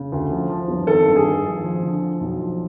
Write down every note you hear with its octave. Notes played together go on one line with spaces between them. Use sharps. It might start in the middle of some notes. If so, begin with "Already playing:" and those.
Already playing: C#3
D2
F3
F3
G1
G#1 A4
G2
G#4
G#1
F3
F3
D3
F3
B1
F3